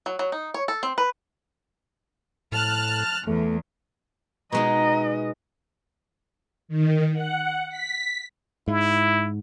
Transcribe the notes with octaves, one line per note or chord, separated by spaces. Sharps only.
F#3
F#3
D#4
C#5
A4
C4
B4
A2 A5 F6 F#6
E2 A3
B2 G#3 D#4 D#5 A#5
D#3
F#5
B6
G#2 E4